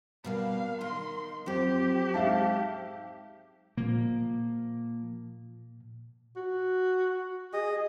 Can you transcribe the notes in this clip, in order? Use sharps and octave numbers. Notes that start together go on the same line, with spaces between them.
B2 G3 A#3 F5
D#3 D#4 C6
F2 F#3 C4 G4
G#2 E5 F5 A5
A#2 F3 A#3
F#4
G#4 D#5